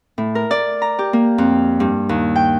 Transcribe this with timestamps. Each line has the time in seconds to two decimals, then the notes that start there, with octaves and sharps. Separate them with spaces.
0.18 A2
0.35 A#4
0.51 D5
0.82 A#5
0.99 G4
1.13 A#3
1.38 F2
1.80 G2
2.09 D#2
2.36 G5